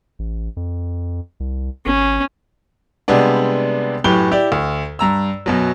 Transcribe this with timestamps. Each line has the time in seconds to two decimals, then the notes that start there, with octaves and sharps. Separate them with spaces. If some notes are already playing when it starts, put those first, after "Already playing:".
0.19 A1
0.57 F2
1.40 C2
1.86 G#1 C#4
3.08 C3 G3 G#3 B3 D4
4.04 F#2 A2 G4 B4 G7
4.31 E4 G4 D5
4.52 D2
4.99 G2 A#5 E6
5.46 F#2 B2 F#3